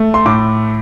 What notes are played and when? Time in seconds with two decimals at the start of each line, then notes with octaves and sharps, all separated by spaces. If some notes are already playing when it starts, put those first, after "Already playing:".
Already playing: A3
0.14 C6
0.26 A2 D6